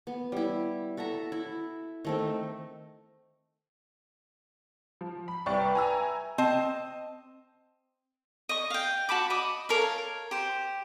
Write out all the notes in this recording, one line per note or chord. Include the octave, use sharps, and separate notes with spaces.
B3
G3 E4
F#4 A4 E5 A#5
E4
D#3 A3 C4
F3
B5
C2 B4 D5 E5 G5 C#6
G#5 A#5 E6
C4 D#5 A5
D#5 C#6
F5 G5
F#4 A5 B5 D6
D#5 B5 D6
A4 A#4 C#5 F5
G4 C5